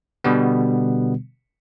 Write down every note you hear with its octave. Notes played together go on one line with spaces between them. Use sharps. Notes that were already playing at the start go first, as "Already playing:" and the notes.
B2 D3 G3 B3